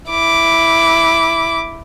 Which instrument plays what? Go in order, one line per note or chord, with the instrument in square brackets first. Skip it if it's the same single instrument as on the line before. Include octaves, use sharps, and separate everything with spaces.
[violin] E4 D6